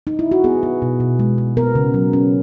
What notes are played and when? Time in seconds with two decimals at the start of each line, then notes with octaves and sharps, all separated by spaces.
0.07 D#4
0.19 E4
0.31 F#4
0.44 B3 G#4
0.63 B3
0.82 B2
1.00 B2
1.19 G#3
1.38 G#3
1.57 B3 A#4
1.75 C#3
1.94 F#3
2.13 C#4